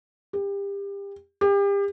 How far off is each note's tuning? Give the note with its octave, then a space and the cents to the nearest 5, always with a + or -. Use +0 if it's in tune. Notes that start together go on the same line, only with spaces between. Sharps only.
G4 +30
G4 +35